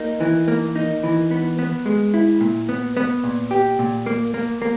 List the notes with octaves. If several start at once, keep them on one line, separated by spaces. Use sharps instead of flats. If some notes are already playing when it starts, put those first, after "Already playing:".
Already playing: A#3 D#4
E3
A#3
D#4
E3
B3
B3
G#3
E4
A#2
B3
B3
A#2
G4
A#2
A#3
A#3
A#3